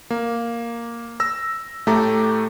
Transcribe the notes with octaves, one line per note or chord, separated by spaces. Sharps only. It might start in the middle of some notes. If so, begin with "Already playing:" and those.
A#3
E6 A#6
A2 A3 G4 A4 A#5 D6